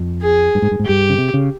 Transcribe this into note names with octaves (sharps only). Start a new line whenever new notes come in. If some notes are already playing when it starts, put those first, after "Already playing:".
Already playing: F2
G#4
G2
G#2
G2
G#2
G2 G4
C#3
C3
C#3